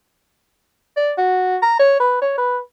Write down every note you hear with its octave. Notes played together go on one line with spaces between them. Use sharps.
D5
F#4
A#5
C#5
B4
C#5
B4